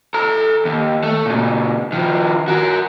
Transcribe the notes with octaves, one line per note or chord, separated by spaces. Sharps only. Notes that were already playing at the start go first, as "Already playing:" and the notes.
A4 A#5
D#2
A3
A#2 C#3
D#3 F3
F#4 A#4